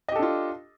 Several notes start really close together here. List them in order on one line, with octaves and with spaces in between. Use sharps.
D#5 G4 A4 D4 F4